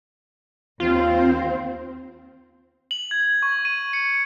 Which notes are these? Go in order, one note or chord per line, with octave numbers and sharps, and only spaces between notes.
D#2 C4 F4 C5
F#7
G#6
C#6
D#7
C#7